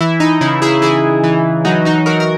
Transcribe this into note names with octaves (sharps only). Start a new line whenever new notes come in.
E3 E4
D#4
C#3 E4
E4 G#4
E3 E4 G#4
E3
F#3 D#4 F#4
D#4 F#4
F#3 F#4 A#4
A#4